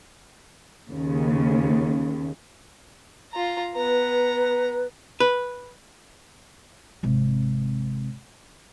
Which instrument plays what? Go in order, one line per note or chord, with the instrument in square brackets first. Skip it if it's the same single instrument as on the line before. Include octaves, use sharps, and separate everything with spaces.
[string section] D#2 C#3
[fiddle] F4 A#5
[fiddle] B3 A#5 [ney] B4
[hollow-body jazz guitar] B4
[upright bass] G#1 C3